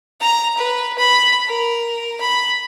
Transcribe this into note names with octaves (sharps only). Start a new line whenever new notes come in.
A#5
B4
B5
A#4
B5